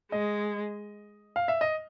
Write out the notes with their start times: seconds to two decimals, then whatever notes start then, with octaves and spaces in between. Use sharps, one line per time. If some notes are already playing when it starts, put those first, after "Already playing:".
0.12 G#3 D#5
1.36 F5
1.48 E5
1.61 D#5